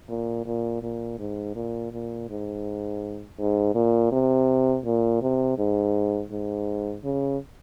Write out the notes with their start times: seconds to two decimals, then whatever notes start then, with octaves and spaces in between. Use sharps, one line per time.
0.09 A#2
0.46 A#2
0.82 A#2
1.19 G#2
1.55 A#2
1.92 A#2
2.29 G#2
3.38 G#2
3.75 A#2
4.12 C3
4.85 A#2
5.22 C3
5.58 G#2
6.31 G#2
7.04 C#3